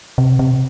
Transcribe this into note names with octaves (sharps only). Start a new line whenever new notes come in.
C3
C3